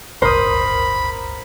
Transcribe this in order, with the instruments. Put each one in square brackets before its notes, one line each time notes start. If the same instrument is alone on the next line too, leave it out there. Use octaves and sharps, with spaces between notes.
[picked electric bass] D1 G1 C#2 [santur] A#4 [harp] C5 D#6 [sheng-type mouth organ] B5